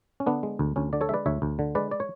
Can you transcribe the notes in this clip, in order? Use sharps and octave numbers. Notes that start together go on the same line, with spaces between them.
C#4
D3 B3 D4
G#3
D2
D2 C#4
D3 D5
A4 C#5
G#3 B4 D5 E5
D2 C#5 E5
D2
D3
G#3 B4 D5
D5
C#5